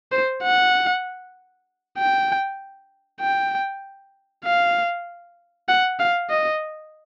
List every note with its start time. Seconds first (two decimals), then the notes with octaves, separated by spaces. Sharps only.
0.12 C5
0.43 F#5
1.98 G5
3.21 G5
4.45 F5
5.68 F#5
5.99 F5
6.30 D#5